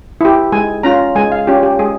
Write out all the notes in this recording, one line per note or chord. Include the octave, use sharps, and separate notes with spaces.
E4 G4
G#3 G#5
C#4 F4 A#5
G#3 G#5
F5
C#4 F4 G4
G4
G#3 G#4